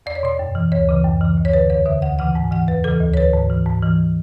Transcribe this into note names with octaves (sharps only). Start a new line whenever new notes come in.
E2 D5
C#5
B2 D5
F#2
E3
D2 C#5
C#3 E3
F#2
C#3 E3
D2
C#5
D3 B4
E2 C#5
D3 E5
D2 F#5
C#3 E3 F#5
G#2 G#5
E3 F#5
E2 B4
C#3 E3 A4
D2
C#5
D3 B4
G#2
E3
G#2
E3